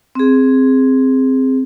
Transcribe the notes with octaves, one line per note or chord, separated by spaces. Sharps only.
C4 G#4